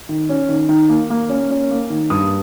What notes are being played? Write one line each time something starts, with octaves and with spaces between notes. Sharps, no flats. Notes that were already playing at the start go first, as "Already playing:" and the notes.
D#3
C#4
D#3
D#3
A#3
A#3
C#4
C#4
A#3
D#3
G2 D#6